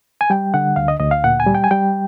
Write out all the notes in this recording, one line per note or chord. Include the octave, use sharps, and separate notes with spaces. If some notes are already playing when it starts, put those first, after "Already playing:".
G#5
G3 G5
D3 F#5
D2 F5
D#5
D2 D#5
F5
A#2 F#5
G#5
G3
G5
G#5
G3 G5